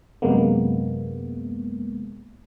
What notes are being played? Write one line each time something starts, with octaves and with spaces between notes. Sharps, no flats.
F#2 C3 G#3 A#3 B3